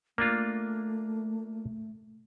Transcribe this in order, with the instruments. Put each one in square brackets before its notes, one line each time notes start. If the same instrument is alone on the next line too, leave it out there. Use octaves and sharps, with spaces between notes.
[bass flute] A3 [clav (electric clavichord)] A#3 D4 F4